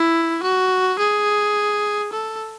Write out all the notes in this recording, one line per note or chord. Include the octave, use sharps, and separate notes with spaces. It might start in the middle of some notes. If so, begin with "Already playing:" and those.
Already playing: E4
F#4
G#4
A4